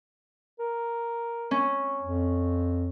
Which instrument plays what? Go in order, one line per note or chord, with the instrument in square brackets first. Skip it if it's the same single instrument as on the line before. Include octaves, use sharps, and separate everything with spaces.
[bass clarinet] A#4
[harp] C#4
[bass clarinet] F2